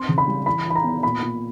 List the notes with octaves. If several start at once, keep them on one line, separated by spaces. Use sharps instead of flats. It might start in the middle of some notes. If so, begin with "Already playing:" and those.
Already playing: C4 C6
C#3
B5
G3
E3 B5
E3
B5
A#5
B3
A#2 B5
A#2